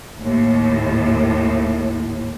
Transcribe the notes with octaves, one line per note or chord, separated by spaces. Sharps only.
D#2 A2